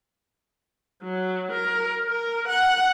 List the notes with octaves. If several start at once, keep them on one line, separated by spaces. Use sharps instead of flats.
F#3
A#4
A#4
F#5